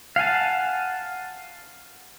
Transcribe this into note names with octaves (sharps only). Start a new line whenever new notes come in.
F5 F#5 G#5 A5